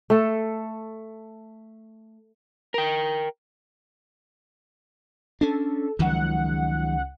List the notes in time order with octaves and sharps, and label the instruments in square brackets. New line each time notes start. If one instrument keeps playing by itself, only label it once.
[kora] A3 A4
[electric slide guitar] A#4 G5
[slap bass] C#4 D4 [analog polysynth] A4
[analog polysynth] C#2 F#5 [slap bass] D#3 F3 F#3